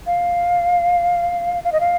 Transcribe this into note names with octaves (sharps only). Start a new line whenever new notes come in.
F5
F5
D#5
F5